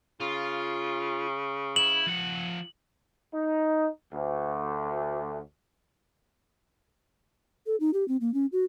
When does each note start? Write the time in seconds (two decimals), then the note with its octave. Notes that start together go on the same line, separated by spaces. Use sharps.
0.20 C#3 F4
1.76 E4 F#7
2.07 F3 F#5
3.33 D#4
4.10 D2
7.67 A4
7.80 D#4
7.94 G4
8.08 C4
8.21 A#3
8.34 C#4
8.52 F#4